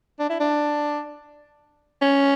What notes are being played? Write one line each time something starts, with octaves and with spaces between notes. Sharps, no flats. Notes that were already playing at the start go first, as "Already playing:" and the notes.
D4
E4
D4
C#4